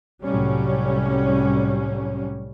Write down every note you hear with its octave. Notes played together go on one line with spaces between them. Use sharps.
C2 A2 F#3 G3 C#4